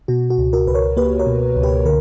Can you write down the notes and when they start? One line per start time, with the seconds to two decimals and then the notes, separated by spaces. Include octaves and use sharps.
0.08 B2 F#4
0.30 F#4
0.38 C#2
0.53 F#4 A#4
0.67 C#2 B4
0.75 A#4 C#5
0.97 A#3 G4 B4
1.19 A#4 C#5
1.26 B2
1.56 C#2
1.63 G4 B4
1.85 D3 A#4